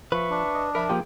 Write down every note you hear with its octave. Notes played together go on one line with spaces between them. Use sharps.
F3 B4 E5 C#6
D4
D#5
F3 A#4 E5 B5
F3 A#3 F4 G4 G#4 G5